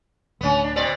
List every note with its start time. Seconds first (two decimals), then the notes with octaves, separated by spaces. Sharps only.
0.41 D1 D2 B3 C#4
0.64 D4
0.76 B2 C4 D5